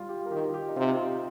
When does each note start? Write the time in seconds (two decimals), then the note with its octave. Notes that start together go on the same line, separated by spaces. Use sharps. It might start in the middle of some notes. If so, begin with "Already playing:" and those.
Already playing: G3 F4
0.09 G4
0.26 A#4
0.31 D#3 G4
0.45 F4
0.54 G4
0.69 D#4
0.76 C3 F4
0.99 C4